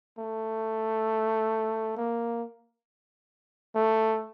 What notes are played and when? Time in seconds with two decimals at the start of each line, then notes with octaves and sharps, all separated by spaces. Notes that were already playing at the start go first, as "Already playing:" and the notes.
0.18 A3
1.97 A#3
3.75 A3